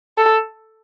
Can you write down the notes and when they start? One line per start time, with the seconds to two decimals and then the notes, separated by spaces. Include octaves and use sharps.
0.18 A4